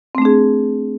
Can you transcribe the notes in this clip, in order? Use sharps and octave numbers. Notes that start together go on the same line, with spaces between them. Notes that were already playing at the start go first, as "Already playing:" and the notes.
A3 C4 D4 G#4